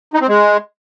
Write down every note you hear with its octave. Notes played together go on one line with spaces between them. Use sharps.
D#4
C4
G#3